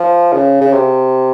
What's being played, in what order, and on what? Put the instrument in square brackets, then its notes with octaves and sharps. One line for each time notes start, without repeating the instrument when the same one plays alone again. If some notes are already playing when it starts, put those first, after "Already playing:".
Already playing: [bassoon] F3
C#3
C#3
C3